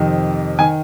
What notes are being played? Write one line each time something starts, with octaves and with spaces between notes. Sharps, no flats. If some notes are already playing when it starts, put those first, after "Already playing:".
Already playing: F2 C3 D#3
D#3 G#5